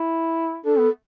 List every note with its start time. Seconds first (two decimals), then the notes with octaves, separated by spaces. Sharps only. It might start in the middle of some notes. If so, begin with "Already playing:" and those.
Already playing: E4
0.65 D4 A4
0.78 B3